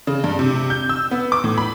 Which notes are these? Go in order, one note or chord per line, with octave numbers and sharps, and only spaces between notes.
C#3
G2
C3
G6
E6
B3
D6
A2
B5